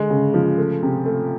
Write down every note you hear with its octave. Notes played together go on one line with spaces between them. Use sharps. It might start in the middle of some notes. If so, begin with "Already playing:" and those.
Already playing: D3 G#3
C#3
F3
A3
C3
A3